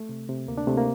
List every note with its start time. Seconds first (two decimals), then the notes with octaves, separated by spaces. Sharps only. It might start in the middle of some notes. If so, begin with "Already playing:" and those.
Already playing: A3
0.09 C3
0.29 C3
0.48 D2 A#3
0.58 D4
0.67 C3 A3
0.78 A#3